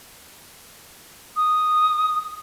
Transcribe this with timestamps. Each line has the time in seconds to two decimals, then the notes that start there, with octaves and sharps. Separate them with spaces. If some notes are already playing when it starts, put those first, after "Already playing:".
1.36 D#6